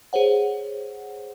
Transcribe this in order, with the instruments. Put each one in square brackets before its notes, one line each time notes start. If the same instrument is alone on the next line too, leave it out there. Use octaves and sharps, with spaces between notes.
[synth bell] G#4 C5 C#5 F#5